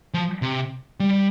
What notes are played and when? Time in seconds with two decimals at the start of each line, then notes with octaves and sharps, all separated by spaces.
0.14 F3
0.42 C3
1.00 G3